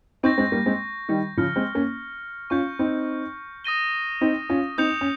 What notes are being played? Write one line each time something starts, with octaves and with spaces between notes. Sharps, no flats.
C4 D#4 C#6 G6 A#6
G#3 C4
G3 A#3
G#3 C4
D#3 G3
C#3 F3 F6 A#6 C#7
G#3 C4
A#3 C#4
C#4 F4 C#6 G6 C#7
C4 D#4
D#6 A#6 D#7 G7
C4 D#4
C#4 F4
C4 D#4 D#6 G6 C#7 F7
C#4